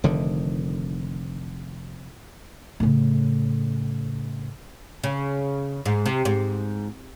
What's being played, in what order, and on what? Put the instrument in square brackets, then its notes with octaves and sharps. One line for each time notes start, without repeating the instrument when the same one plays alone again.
[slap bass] F1 D3 D#3
[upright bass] A2 C#3
[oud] C#3
G#2
C3
G#2